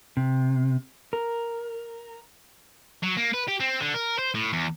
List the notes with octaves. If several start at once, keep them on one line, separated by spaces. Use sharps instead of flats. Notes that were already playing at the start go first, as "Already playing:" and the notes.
C3
A#4
F#3
A#3
B4
G4
C4
D3
A#4
C5
A2
E2